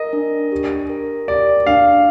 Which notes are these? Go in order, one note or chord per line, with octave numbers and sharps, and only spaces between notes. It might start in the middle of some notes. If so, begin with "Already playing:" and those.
Already playing: A#4 D#5
D4
G4
A#4
G4 D5
D4 F5